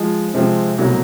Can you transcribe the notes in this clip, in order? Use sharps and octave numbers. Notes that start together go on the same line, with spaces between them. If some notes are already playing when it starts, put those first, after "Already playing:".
Already playing: F3 G#3
C3 F3 G#3 C4
C2 B2 F#3 A3